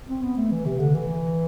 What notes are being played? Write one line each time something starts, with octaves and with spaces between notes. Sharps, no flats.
C4
B3
A3
E3
C3
D3
E3